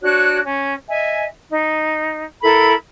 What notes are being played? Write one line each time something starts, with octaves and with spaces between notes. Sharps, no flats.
D4 F#4 C#5 F#6
C#4
D#5 E5 G#5
D#4
E4 A4 A#4 B5